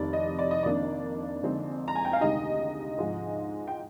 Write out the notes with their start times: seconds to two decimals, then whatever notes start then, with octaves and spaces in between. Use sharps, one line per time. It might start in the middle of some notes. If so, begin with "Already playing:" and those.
Already playing: F1 F2 C3 D#3 D5
0.13 D#5
0.39 D5
0.51 D#5
0.63 F2 D#3 A#3 D4 D5
1.43 F2 D3 G#3 C4 D#4
1.88 A#5
1.95 G#5
2.05 G5
2.13 F5
2.20 D2 C3 D#3 G#3 D#4 D#5
2.98 G#2 F3 G#3
3.67 G5